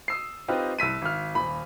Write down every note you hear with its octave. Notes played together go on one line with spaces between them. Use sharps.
D#6 E6 C7
C4 D#4 F4 G4 B4 D#5
C2 E6 B6 D#7
G#1 F6
D#1 B5